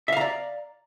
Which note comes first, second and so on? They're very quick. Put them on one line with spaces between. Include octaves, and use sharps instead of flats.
E5 F5 A#5 D5